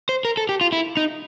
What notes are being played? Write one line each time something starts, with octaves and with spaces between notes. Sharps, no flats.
C5
A#4
A4
G4
F4
E4
D#4